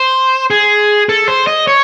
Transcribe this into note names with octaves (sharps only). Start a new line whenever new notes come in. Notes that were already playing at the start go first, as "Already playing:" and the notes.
Already playing: C5
G#4
A4
C5
D#5
C#5